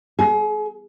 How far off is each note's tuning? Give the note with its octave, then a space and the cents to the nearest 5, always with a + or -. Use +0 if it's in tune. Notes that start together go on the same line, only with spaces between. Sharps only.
G#4 +35